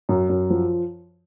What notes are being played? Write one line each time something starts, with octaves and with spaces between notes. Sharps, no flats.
F#2
F#2
F3